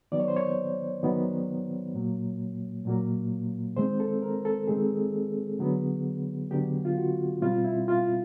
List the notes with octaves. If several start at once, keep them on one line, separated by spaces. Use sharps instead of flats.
D#3 F#3 B3 D5
C#5
C5
C#5
D#3 F#3 B3
A#2 F#3 A#3
A#2 F#3 A#3
D#3 G#3 C4 C5
A4
A#4
A4
D#3 G#3 C4 G#4
D3 F#3 B3
D3 F#3 B3 G4
F4
F#4
B2 G3 C4 F4
E4
F4